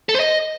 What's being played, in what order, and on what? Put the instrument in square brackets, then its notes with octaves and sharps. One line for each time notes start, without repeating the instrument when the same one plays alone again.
[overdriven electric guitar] A4
C5
D#5